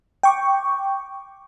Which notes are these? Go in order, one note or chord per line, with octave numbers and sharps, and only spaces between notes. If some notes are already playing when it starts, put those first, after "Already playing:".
G5 C#6 D6